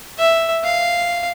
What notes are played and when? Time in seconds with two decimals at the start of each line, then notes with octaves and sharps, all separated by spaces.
0.19 E5
0.64 F5